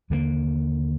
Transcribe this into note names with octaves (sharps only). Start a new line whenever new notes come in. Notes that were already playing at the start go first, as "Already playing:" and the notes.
D#2 D3 F#3 A#3